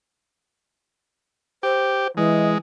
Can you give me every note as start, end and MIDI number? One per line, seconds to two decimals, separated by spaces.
1.63 2.08 67
1.63 2.11 72
2.17 2.56 52
2.17 2.58 56
2.17 2.48 75